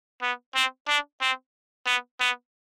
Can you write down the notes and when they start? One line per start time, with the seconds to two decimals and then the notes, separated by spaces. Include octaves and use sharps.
0.22 B3
0.55 C4
0.88 D4
1.21 C4
1.86 B3
2.20 B3